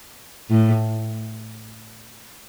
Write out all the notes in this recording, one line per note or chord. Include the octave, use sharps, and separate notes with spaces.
A2